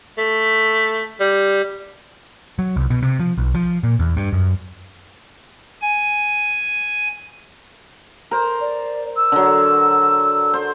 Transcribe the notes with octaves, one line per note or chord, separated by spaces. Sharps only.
A3
G3
F#3
C2
B2
C3
F3
B1
F3
A#2
E2
G2
F#2
G#5
A#4 C5
D5
E6
D3 F#3
C5